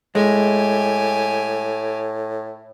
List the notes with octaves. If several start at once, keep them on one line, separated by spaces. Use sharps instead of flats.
A2 G#3 G4 G#5